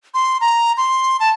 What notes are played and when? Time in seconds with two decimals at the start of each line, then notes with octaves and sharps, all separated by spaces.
0.14 C6
0.41 A#5
0.77 C6
1.20 A5